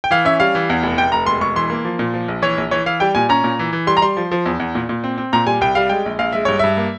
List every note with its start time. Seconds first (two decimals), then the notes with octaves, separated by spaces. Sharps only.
0.04 G5
0.11 E3 F5
0.25 C#4 E5
0.40 G3 F5
0.55 E3
0.70 E2
0.83 F1
0.97 F1 G5
1.12 F1 A#5
1.26 E1 C6
1.41 E1 C#6
1.56 E3 C6
1.70 A#3
1.85 F3
1.99 A#2
2.14 F3
2.28 A#1
2.42 E3 C#5
2.58 A#1
2.71 E3 C#5
2.86 E3 F5
3.00 G3 G5
3.15 A#2 G#5
3.29 C#4 A#5
3.44 A#2
3.59 E3
3.73 E3
3.87 G3 C6
3.97 A#5
4.02 G3 C6
4.17 F3
4.31 F3
4.46 E2
4.60 E2
4.75 A#2
4.89 A#2
5.04 C4
5.18 C4
5.33 A#2 A#5
5.47 G3 G#5
5.61 C2 G5
5.75 G3 F5
5.89 G#3 G5
6.06 A#1
6.19 A#1 F5
6.33 G#3 E5
6.45 G2 C#5
6.59 G2 E5
6.77 A#3